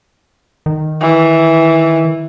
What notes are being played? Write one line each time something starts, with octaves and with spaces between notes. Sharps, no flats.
D#3
E3